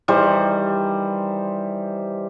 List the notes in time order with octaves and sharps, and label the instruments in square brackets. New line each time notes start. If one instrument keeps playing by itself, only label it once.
[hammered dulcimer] D#3 E3 G3 C5